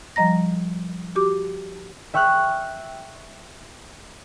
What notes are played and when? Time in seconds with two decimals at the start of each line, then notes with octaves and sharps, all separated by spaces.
0.16 F3 G3 D#5 A#5 A#6
1.15 F#4 G4 D6
2.14 E5 G5 C#6 F6 F#6